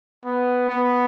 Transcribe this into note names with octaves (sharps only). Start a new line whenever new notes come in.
B3
B3